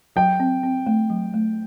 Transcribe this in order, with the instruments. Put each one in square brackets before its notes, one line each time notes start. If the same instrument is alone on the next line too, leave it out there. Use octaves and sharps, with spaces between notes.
[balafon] F#3 [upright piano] G5
[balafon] C4
C4
A3
F#3
A3